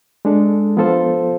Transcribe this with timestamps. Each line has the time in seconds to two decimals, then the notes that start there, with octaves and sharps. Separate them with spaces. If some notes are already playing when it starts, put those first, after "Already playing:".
0.25 G#3 D4 A4
0.77 F3 B3 F4 A4 C5